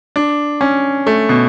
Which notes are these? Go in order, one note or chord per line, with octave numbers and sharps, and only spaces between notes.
D4
C#4
A3
B2